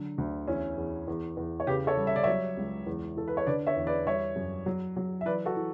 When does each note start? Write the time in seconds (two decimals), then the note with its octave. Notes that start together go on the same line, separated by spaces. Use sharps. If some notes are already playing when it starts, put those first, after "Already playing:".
Already playing: D3 F#3
0.18 D2
0.47 E2 C#4 E4
0.78 E2
1.08 E2
1.37 E2
1.60 C#5
1.67 C#3 G4 B4
1.87 A4 C#5
1.97 G3
2.07 E5
2.16 D5
2.23 F#3 C#5 E5
2.58 C#2
2.86 E2
3.17 E3 A4
3.28 B4
3.37 C#5
3.47 D3 B4 D5
3.67 C#5 E5
3.77 E2
3.87 B4 D5
4.06 G3 C#5 E5
4.36 F#2
4.66 F#3
4.96 F#3
5.21 E5
5.26 E3 B4 D5
5.46 F#4 A4
5.56 E3